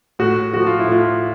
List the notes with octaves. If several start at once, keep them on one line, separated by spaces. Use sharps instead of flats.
A2 F#4
F3 A3 F#4
F4
E4
A2
F4